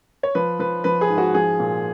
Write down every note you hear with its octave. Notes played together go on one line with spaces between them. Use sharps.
C#5
F3 B4
F3 B4
F3 B4
G#4
G#2
F#4
F3 G#4
A#2